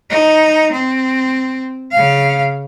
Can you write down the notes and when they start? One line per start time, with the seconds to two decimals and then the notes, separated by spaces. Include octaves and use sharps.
0.10 D#4
0.72 C4
1.92 C#3 F5